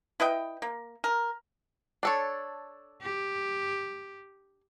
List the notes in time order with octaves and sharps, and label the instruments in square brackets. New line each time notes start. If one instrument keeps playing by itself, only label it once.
[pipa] E4 B4 D#5 G5
A#3
A#4
[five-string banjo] D4 A4 C#5
[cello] G4